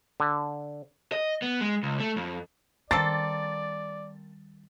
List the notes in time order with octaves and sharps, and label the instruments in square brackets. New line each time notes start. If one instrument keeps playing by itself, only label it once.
[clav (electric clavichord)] D3
[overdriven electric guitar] D#5
B3
G#3
C#2
A3
F2
[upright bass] D#3 G3 [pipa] A#3 C4 A4 [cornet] D5 [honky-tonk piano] A6